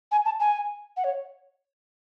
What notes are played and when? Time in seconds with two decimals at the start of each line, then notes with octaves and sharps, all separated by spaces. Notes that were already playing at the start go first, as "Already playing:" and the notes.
0.12 G#5
0.25 A5
0.40 G#5
0.97 F#5
1.04 C#5